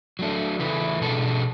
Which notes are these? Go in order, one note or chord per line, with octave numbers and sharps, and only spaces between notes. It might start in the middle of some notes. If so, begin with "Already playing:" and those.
F#3 A3 D4
C#3 E3 A3 E4 B4
B2 G#3 D4 A4